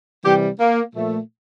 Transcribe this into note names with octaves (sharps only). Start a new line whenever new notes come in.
C3 E3 G3 G4
A#3
A#2 F3 A3